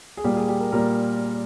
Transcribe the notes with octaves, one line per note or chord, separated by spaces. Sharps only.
G#4
A#2 G3 A#3 G4
G#4
G4
A#4
A#2 G3 A#3 A#4